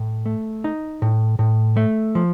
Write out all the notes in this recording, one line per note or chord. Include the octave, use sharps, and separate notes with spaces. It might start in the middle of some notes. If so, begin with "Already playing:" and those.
Already playing: A2
A3
D#4
A2
A2
A3
F3